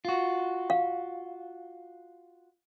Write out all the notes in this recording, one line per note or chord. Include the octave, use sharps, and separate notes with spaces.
F4 F#4
F5